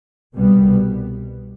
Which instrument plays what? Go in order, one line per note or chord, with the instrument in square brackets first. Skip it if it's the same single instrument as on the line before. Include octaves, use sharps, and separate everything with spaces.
[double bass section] C2 B2 G3 B3